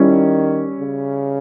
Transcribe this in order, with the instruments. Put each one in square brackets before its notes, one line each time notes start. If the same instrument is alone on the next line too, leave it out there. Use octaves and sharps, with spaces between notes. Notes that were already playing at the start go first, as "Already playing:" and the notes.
Already playing: [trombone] D#3 [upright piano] G3 C#4 E4
[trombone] C#3